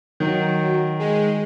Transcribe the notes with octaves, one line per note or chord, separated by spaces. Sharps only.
D#3 F#3
G#3